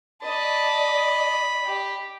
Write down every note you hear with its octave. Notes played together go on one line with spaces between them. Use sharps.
D5 D#5 A5 B5
G4